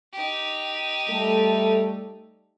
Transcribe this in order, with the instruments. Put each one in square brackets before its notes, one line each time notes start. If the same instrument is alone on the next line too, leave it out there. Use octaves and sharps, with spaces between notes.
[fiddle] D#4 G4
[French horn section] G3 A3 A4